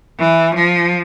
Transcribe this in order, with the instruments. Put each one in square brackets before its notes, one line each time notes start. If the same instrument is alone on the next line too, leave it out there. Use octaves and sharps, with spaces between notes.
[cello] E3
F3